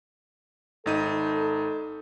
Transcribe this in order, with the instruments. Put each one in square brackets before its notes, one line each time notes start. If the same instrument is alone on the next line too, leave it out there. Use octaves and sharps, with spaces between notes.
[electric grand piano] G#1 D#4 D#7 [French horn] A4